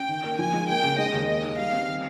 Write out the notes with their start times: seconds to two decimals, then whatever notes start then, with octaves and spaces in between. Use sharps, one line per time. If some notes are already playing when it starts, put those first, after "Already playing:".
Already playing: C#4 G5
0.08 D#3
0.24 A#3
0.39 F3 G#5
0.53 G#3
0.68 A#3 G5
0.84 C#3
0.98 G#3 D#5
1.13 D#2
1.28 A#3 D#5
1.43 D#4
1.58 G3 F5
1.73 C4
1.88 D#3